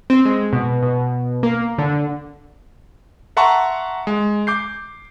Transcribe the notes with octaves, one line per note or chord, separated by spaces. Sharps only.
C4
G#3
B2
B2
A#3
D3
E5 F#5 A5 A#5 C6 C#6
G#3
D6 G6 C7